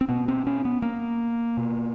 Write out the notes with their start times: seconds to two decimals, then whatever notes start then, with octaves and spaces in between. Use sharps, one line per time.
0.01 C4
0.09 B2 B3
0.28 C4
0.47 C#4
0.65 B3
0.82 A#3
1.57 B2